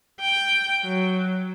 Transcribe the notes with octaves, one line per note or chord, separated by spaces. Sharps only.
G5
F#3